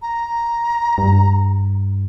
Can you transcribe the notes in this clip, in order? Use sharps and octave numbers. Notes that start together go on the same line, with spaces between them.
A#5
G2